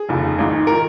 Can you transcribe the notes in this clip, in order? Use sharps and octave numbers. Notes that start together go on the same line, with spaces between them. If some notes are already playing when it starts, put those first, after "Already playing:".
Already playing: G#4
F1 D#2 C#3
G#1 G#2 D#3
D#3 A#4